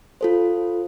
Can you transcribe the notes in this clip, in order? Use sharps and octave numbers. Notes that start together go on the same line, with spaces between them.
F4 A4 C5